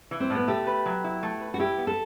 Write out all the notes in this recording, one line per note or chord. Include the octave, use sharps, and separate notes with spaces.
E3
C4
A2 B3
A3 G4
B4
F#3
E4
A3
B4
F#4
E4 G4
B3
A4